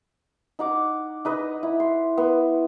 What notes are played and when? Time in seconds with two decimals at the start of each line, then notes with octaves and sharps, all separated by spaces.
0.59 D#4 F#5 D6
1.25 D#4 B4 D#5
1.63 E4
1.80 C6
2.18 B3